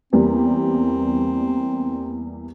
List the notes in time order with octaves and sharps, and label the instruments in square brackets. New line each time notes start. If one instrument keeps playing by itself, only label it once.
[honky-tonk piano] E2 G3 A#3 [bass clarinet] C4